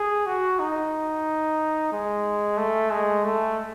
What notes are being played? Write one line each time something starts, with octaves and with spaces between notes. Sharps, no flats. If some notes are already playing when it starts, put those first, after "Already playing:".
Already playing: G#4
F#4
D#4
G#3
A3
G#3
A3